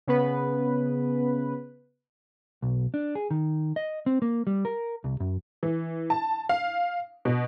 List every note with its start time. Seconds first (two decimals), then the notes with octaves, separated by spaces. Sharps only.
0.07 C#3 B3 B4
2.62 B1
2.94 D4
3.15 G#4
3.31 D#3
3.76 D#5
4.06 C4
4.22 A#3
4.47 G3
4.65 A#4
5.04 C2
5.20 F#2
5.63 E3
6.10 A5
6.49 F5
7.25 B2